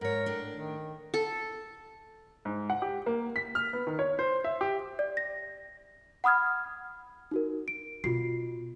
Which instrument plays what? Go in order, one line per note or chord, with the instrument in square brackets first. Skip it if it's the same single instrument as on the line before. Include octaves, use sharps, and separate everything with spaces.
[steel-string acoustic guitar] G#2 C#5 [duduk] A#4
[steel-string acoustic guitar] A2 D4
[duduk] D#3
[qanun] A4
[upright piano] G#2
F#5
G4
A#3
B6
F6
B3
D#3
C#5
C5
E5
G4
[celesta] D5
A#6
F#5 B5 D#6 F6 G#6
D#4 F#4 A#4
D7
[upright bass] B2 [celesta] F4 F#4 C7